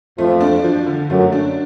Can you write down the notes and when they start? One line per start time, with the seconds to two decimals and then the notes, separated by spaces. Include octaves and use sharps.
0.18 F2 F3 A3
0.41 D4
0.64 F3
0.87 D3
1.10 F#2 F#3 A3
1.32 D4